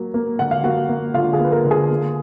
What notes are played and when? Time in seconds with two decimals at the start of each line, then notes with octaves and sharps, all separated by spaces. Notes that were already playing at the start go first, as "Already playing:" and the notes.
Already playing: F#3 A#3
0.14 A#3
0.39 D3 F#5
0.51 F5
0.64 A#3 F#4 F#5
0.89 A#3
1.14 D3 F4 F5
1.33 G#4
1.39 A#3 B4
1.52 A#4
1.64 D3
1.71 G#4
1.90 A#3